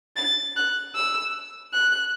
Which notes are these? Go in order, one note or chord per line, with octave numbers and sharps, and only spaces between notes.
A6
F#6
E6
F#6